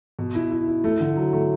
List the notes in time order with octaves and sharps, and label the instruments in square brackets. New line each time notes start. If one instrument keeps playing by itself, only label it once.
[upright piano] B2
E4
E4
E4
A3
D3
F#3
A3